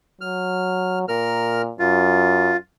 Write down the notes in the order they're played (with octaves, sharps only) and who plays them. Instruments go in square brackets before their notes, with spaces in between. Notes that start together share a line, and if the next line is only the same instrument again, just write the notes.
[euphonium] F#3 [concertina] F6
[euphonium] A#2 [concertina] A#4 F6
[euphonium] F#2 [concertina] F4